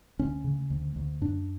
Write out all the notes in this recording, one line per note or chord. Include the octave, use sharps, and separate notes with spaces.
D2 C#4
C#3
D2
D2
F#2 D4